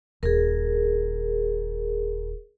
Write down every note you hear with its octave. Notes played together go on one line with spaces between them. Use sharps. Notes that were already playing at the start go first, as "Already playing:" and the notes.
D#1 G#4 A#4